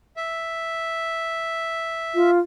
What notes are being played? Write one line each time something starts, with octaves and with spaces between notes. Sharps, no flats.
E5
F4